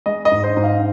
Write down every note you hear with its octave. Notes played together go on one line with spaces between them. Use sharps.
G#3 D#5
D#5
G#2
C5
G#2
F5